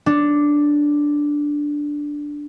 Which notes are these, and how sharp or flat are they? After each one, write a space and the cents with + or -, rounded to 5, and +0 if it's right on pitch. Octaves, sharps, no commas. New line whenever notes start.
D4 +0 C#5 +0